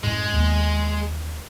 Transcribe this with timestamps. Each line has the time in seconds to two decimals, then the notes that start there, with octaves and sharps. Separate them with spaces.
0.03 F#2 A2 G#3
0.33 D#2 B3